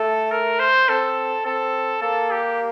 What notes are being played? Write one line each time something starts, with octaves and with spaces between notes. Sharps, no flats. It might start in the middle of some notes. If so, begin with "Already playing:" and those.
Already playing: A3 A4
A#4
C5
C4 A4
C4 A4
A#3 A4
G4